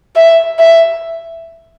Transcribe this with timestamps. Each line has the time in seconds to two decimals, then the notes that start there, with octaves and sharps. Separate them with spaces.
0.16 E5
0.59 E5